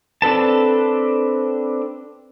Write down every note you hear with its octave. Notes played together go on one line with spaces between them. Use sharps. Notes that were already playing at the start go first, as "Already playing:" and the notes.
C4 D4 A4 B4 A5